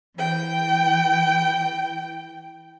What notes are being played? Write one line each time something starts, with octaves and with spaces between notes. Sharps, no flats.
E3 G5